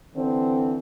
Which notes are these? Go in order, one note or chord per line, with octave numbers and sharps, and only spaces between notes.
D3 E3 C4